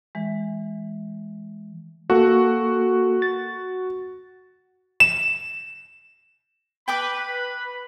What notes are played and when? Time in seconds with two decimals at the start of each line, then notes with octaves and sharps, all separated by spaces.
0.15 E3 G#3
2.10 A#3 F#4 A4
3.22 A6
5.00 E7
6.88 B4 G5 A5 B5 D6